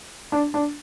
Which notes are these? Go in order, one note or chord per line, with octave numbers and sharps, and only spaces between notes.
D4
D4